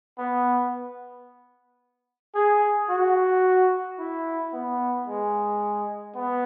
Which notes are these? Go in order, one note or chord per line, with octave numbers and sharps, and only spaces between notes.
B3
G#4
F#4
E4
B3
G#3
B3